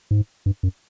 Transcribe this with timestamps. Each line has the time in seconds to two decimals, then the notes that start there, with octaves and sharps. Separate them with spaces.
0.11 G#2
0.46 G2
0.63 F#2